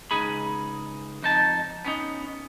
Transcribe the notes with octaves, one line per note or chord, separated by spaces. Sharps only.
C#2 D#4 G#4 B5
F2 D#4 A5
B3 C#4 D#4